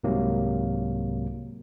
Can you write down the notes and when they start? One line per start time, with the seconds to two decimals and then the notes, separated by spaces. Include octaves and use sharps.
0.04 C2 G#2 C3 F#3 A#3